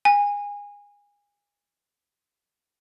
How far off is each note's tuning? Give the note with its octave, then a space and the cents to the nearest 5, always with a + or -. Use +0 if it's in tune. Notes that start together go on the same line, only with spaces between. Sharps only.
G#5 -25